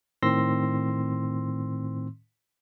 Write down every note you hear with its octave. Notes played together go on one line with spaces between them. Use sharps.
A2 D#3 C4 C6 E6 A#6